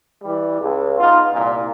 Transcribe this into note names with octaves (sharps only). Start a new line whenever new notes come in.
E3 G3
C#2
B3 D#4 F4
C2 A#2